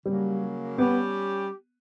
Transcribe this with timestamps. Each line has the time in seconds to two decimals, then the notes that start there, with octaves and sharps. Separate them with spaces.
0.06 C#3 F#3 G3 A#3
0.78 G3 B3 C#4 G4